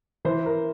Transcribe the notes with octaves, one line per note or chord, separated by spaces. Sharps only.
E3 C5
A#4